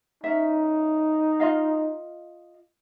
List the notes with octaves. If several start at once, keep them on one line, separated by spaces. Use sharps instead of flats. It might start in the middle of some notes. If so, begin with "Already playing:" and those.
C#4 D#4 E5
F4 D#5 F5